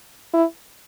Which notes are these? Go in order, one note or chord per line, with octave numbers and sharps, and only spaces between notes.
E4